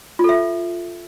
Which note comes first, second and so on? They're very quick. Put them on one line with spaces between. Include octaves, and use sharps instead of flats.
F4 A4 E5